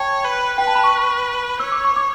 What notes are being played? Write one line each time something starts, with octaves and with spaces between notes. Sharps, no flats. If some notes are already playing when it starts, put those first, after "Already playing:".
Already playing: C#5 G5 A5
B4
B4 G5
A5
B5
C#6
C#5 E6
D6
C#6
D6